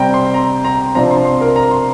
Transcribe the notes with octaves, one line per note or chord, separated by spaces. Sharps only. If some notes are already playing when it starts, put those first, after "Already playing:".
Already playing: C3 G3 C4 G5 A#5
C6
A#5
A#5
C3 F3 D4 A#5
C6
C6
A#4
A#5
C6